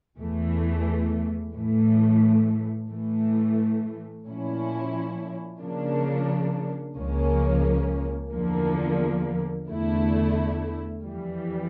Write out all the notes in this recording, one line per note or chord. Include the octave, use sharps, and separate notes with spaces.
E2 E3 A3
A2 E3 A3
A2 E3 A3
A#2 F3 C#4 E4
C#3 F3 A#3 D4
C#2 C#3 F3 A#3 C#4
E2 D3 F3 A#3
E2 D3 A3 E4
F2 E3 G3